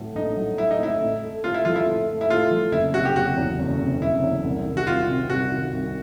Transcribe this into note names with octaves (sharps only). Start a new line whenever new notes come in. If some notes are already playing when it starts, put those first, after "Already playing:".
Already playing: A2 F#3 A3
A#1 D#4
F#3
A3 E4
D#4
A2 E4
A2
A3
A2 F4
E4
F3 F4
E4
A2
A3
E4
A2 F4
F3
F#1 E4
C3 F#4
G4
F#1 F#4
E2
F#1
C3
F#1 E4
E2
C2
D#3
F#4
C2 F4
C3
C2 F#4
D#3
C2